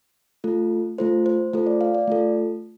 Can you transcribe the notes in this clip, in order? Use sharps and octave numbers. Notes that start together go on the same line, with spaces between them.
A3 F4 A4
A3 F4 A4 C5
C5
A3 F4 A4 C5
D5
F5
D5
A3 F4 A4